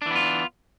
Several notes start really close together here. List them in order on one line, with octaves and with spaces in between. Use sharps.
D4 E3 B3 F4